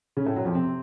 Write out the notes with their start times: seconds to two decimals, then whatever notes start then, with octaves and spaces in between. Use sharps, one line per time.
0.17 C#3 C#4
0.26 A2 A3
0.36 F#2 F#3
0.45 F2 F3
0.54 C3 C4